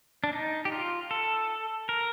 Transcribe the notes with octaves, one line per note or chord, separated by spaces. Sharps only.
D4
D#4
G4
F4
A4
A#4